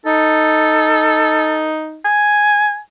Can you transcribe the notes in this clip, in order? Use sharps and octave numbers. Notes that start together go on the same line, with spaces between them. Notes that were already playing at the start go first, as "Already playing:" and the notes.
D#4 A4
G#5